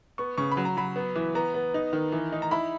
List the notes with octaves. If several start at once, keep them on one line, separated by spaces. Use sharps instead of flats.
B3 C#6
C#3 C#6
B5
F#3
A#5
F#3 B5
B3
E3
B3 A#5
B3
D#4
D#3
E3
D#4
A#5
E4 B5